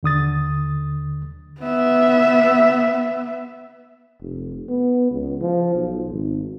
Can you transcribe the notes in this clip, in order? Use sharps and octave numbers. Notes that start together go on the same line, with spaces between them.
D#2 D3 D#6 A6
B3 E5
F1
B3
C#2
F3
B1
G#1